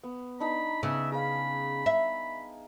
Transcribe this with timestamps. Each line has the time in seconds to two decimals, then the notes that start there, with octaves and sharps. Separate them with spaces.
0.04 B3
0.40 D4 D#4 A#5 B5
0.83 C#3 B3 E5
1.12 G#4 F5 B5
1.86 E5